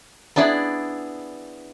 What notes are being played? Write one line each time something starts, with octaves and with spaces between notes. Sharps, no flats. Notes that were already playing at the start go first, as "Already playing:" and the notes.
B3 D4 E4 G#4 D5